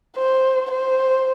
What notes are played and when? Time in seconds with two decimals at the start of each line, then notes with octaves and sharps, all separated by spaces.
0.17 C5
0.72 C5